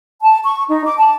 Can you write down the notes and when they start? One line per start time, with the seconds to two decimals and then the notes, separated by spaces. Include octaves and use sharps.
0.22 A5
0.44 C#6
0.68 D#4
0.84 D6
0.98 A5